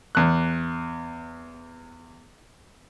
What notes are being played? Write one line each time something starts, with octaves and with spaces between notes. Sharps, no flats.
E2 F#6